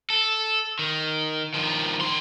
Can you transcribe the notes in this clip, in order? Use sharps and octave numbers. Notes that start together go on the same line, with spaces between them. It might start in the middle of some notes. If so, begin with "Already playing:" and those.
A4
D#3
D#3 F3
D#3 C6